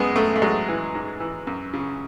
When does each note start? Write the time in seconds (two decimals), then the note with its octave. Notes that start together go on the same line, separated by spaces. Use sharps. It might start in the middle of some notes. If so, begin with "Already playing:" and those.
Already playing: F#2 G#3 B3
0.16 F#2 A3
0.36 A3
0.42 F#3 G#3
0.68 E3
0.95 G#2
1.20 E3
1.47 F#2
1.73 C#3